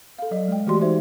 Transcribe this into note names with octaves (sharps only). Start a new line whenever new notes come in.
A4 F5
F#3 D5 D#5
G#3 G5
E3 A3 F#4 G4 D5 C6
D#4 C5 E5